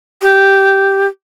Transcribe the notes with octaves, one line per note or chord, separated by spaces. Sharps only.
G4